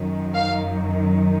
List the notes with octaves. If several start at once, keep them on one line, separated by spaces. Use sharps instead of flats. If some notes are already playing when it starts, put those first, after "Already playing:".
Already playing: F#2 D#3 F#3
F5